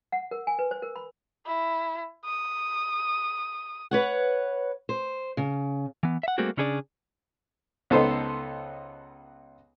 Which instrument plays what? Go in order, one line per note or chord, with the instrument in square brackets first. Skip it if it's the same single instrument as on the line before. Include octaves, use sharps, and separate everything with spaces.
[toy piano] F#5
A#4
G#5
B4
C5
A#4
B5
[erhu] E4
D#6
[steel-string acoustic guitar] B4 C#5 F#5
C5
C#3
[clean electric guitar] E3 B3
E5 F#5
G3 A3 A#3 C4 F#4 G#4
C#3 C#4 D4 G#4 C5 D5
[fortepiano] C#2 B3 D#4 A4 C5